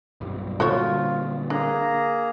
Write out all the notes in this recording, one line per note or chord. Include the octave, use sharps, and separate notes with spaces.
B1 G2 G3
A#2 D3 G3 F4 F#4 C5 C#5
A#3 D4 G#4 A#5